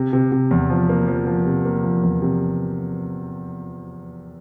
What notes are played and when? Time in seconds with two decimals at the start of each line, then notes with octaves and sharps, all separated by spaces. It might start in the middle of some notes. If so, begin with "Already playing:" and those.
Already playing: C3
0.13 C3
0.32 C3
0.51 E2
0.70 F3
0.89 A#3
1.08 F3
1.27 F3
1.46 C3
1.65 A#3
1.83 F3
2.03 E2
2.22 C3